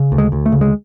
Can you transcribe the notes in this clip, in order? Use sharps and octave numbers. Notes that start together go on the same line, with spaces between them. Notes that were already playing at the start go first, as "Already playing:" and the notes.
Already playing: C#3
D2
G#3
D2
A3
C#3
G#3